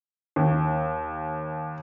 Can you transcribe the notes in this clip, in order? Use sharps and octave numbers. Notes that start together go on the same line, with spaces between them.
D#2